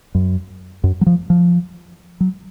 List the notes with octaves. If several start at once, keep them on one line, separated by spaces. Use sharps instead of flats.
F#2
F#2
F#3
F3
F3
F#3